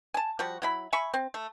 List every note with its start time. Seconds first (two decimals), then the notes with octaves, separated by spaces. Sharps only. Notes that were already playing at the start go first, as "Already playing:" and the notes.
0.14 G#5 A5
0.39 F3 G3 F#4
0.62 F#3 E4 B5
0.93 E5 G#5 B5 C#6
1.14 C4
1.34 A3